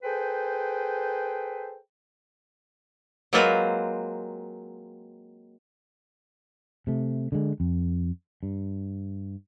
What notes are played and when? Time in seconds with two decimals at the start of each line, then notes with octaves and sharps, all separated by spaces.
0.03 G#4 A4 B4 C5 G5
3.33 F#3 G#3 A#3 C4 F4 B4
6.87 C3 A3
7.32 D3 G#3
7.60 F2
8.43 G2